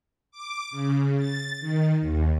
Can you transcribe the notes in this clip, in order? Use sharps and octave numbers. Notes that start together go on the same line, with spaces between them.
D6
C#3
A6
D#3
D#2